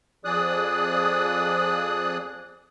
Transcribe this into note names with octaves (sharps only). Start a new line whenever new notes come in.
F2 F3 G#4 D5 D#6 F#6